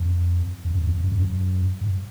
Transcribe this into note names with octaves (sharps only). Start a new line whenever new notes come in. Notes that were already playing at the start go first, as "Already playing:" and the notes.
Already playing: F2
F2
F2
E2
F2
F#2
F2
F#2
G2